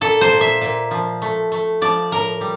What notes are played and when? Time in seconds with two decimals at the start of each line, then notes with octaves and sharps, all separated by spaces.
0.01 A#2 A4
0.21 C5
0.32 A#2
0.41 E5
0.61 A#2
0.91 F3
1.22 A3
1.52 A3
1.81 F3 D5
2.11 A2 A#4
2.41 G3